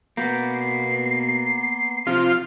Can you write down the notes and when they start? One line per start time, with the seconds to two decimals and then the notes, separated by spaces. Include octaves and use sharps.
0.17 B2 A#3 B3 G6
0.54 C7
2.07 C3 F3 F4